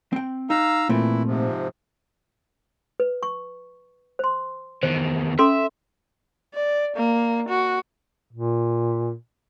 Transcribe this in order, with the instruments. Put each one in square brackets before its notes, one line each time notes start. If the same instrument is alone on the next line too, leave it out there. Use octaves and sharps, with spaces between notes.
[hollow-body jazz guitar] C4 G5
[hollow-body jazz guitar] D#4 [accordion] F5 A#5 E6
[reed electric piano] A#2 [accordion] E3 E4 [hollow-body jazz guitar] A3 C4
[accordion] G#2 C3 F3
[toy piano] B4
C#6
C5 C6
[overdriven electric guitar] E2 D#3 [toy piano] C5
[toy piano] C#4 A4 C6 [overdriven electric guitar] E5
[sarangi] D5
A#3
F#4
[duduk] A#2